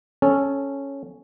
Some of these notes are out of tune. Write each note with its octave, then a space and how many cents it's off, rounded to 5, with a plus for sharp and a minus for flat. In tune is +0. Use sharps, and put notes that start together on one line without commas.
C#4 -5 A4 -10